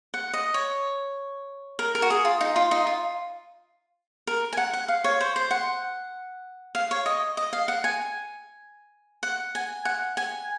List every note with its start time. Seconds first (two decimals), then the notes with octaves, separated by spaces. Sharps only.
0.14 F#5
0.33 D#5
0.54 C#5
1.79 A#4
1.95 A#4
2.02 F#4
2.10 G#4
2.25 F4
2.41 D#4
2.56 F4
2.71 D#4
2.87 F4
4.27 A#4
4.53 G#5
4.57 F#5
4.73 F#5
4.88 F5
5.04 C#5
5.21 C5
5.36 C5
5.51 F#5
6.75 F5
6.91 C#5
7.06 D#5
7.37 D#5
7.53 F5
7.68 F#5
7.84 G#5
9.23 F#5
9.55 G#5
9.85 F#5
10.17 G#5